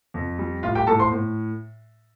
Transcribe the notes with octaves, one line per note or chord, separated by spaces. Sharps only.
F2
G3
A2 F4 F5
G4 G5
A2 A4 A5
C5 C6
A2